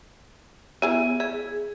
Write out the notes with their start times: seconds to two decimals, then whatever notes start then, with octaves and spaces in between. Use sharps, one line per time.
0.82 B3 E4 G#4 E5
1.20 G#4 E5